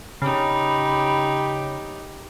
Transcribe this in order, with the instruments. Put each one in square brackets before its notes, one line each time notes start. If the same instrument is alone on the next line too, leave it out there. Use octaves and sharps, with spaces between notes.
[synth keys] C#3 [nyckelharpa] D#4 G4 [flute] B5